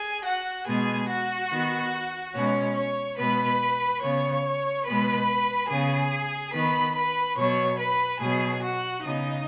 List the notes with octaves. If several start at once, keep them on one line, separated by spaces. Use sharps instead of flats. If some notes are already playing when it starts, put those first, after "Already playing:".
Already playing: G#4 G#5
F#4 F#5
B2 G#3 B3 G#4 G#5
F#4 F#5
D#3 B3
B2 G#3 B3 C#4 C#5
C#5 C#6
B2 G#3 B3 B4 B5
C#3 B3 C#5 C#6
B2 G#3 B3 B4 B5
C#3 B3 G#4 G#5
D#3 B3 B4 B5
B4 B5
B2 F#3 B3 C#5 C#6
B4 B5
B2 F#3 B3 G#4 G#5
F#4 F#5
C#3 B3 D#4 D#5